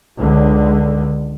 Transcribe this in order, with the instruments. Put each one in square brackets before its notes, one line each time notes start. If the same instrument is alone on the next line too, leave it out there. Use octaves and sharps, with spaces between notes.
[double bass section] C#2 D3 G#3